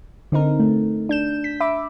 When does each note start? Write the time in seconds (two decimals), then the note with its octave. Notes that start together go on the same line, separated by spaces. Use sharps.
0.32 D3 C4 D#4 A#4
0.60 A3
1.09 D4 G6 E7
1.44 B6
1.60 E5 B5 D6